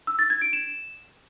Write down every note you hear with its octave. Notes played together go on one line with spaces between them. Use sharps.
E6
A6
G#6
D7
E7